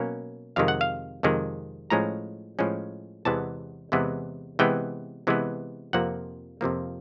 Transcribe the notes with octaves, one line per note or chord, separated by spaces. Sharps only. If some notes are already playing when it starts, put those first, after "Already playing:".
Already playing: B2 F#3 A#3 C#4
F2 C3 D#3 G#3 F5
F#5
F5
F2 C3 D#3 G#3
A2 F3 G#3 C#4 A#5
A2 F3 G#3 C#4
E2 C3 E3 G#3 B3 A5
E2 C3 E3 G#3 B3
C3 E3 G#3 B3 G5
C3 E3 G#3 B3
F2 C3 F3 A#3 F#5
F2 C3 F3 A#3